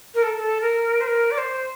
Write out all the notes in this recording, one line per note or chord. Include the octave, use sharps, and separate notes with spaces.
A#4
A4
A4
A#4
C5
A#4
D5
C5